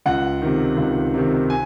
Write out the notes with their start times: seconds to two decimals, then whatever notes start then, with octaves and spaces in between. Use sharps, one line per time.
0.06 C#2 F#5
0.42 C3 D#3
0.77 C#2
1.14 C3 D#3
1.50 G#5